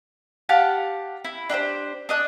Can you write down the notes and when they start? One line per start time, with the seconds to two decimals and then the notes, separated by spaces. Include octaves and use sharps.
0.49 G4 F5 F#5 A5
1.25 E4
1.50 D4 G4 A4 C5
2.09 D4 D#5 F#6